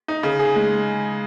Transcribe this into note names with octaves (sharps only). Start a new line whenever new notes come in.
D#4
C#3
G#4
G#3